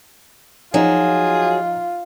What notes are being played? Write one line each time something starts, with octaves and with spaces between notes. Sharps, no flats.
F3 F#3 D#4 F4 G#4